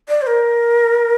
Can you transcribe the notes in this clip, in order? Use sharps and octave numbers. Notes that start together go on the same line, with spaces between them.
D5
C5
A#4